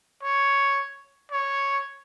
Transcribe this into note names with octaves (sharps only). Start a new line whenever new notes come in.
C#5
C#5